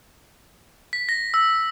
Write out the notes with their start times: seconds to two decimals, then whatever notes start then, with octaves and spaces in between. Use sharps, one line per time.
0.93 B6
1.09 A#6
1.34 E6